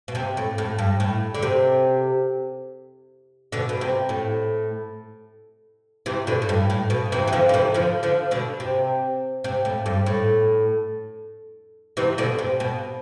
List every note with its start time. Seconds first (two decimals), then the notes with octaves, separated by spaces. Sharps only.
0.08 B2
0.15 C3
0.37 A2
0.58 A2
0.79 G2
1.00 A2
1.35 D3
1.42 C3
3.52 B2 D3
3.69 B2
3.81 C3
4.09 A2
6.06 C3 E3
6.27 B2 D3
6.42 A2
6.49 G2
6.70 A2
6.90 B2
7.12 C3 E3
7.28 E3
7.33 D3 F3
7.49 D3
7.54 C3 E3
7.74 D3 F3
8.03 D3 F3
8.31 B2 D3
8.60 C3
9.44 C3
9.65 A2
9.86 G2
10.06 A2
11.97 C3 E3
12.18 B2 D3
12.39 C3
12.60 B2